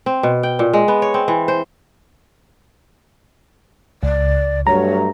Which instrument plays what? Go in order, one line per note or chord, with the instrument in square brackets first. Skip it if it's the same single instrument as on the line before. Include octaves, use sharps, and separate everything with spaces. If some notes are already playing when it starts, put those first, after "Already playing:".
[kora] C4
B2
G5
A#2
G#3
B3
C#5
C4
E3
C5
[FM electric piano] C#2 [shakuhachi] D5
[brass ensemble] G2 F#3 A3 [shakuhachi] C#5 [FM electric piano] A#5